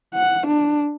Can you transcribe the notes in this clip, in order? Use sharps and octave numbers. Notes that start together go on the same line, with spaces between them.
F#5
D4